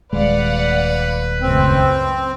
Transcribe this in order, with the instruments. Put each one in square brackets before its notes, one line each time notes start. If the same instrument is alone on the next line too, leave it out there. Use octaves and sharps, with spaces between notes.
[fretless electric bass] D#1 G#3 [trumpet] B4 [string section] D5 F5 F#5
[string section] C#2 F#2 A2 [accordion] C4